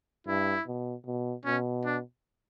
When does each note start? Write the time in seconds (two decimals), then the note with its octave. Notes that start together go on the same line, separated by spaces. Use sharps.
0.27 G2 E4
0.67 B2
1.06 B2
1.45 B2 C#4
1.85 D4